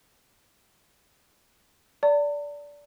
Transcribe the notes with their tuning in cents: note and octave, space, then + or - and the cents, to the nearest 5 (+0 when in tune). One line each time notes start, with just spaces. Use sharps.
D5 -15 A5 +45